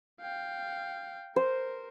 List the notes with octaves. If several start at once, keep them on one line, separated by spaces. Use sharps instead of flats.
F5 G5
A#4 C5